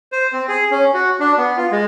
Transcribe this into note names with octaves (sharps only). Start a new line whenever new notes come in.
C5
C4
G#4
C#4
F#4
D4
B3
F4
G#3